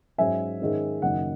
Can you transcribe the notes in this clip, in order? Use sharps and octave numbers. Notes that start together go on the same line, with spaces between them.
G#2 F#3 C#4 E5 G#5
G#2 D#3 G#3 C#4
F#1 F#2 D#3 F#5